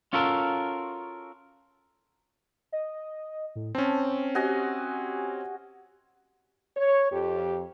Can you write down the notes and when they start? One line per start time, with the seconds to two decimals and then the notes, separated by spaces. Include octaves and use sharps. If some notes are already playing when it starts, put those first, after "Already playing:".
0.13 C#4 F4 F#4 A4 A#4
2.72 D#5
3.56 A2
3.75 C4 C#4 A5
4.35 F#4 G4 D#5 G#5
6.76 C#5
7.11 F2 G4